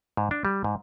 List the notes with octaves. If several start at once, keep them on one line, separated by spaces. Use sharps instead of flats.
G#2
D4
G3
G#2